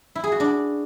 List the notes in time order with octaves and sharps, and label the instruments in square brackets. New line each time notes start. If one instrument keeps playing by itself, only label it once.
[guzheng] E4
G#4
F#4
D4